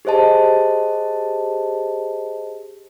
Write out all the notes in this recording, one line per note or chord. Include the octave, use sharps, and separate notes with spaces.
G4 G#4 C5 D#5 A5